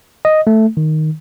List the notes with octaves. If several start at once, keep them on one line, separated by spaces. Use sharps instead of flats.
D#5
A3
D#3